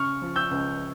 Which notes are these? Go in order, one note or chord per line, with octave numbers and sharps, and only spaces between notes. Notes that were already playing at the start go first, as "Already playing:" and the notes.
Already playing: C#3 C#6 F6
F3
E6 G6
C#2